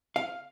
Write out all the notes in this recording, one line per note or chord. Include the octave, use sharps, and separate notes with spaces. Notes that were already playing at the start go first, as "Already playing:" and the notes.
F5